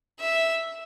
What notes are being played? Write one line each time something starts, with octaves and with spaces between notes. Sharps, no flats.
E5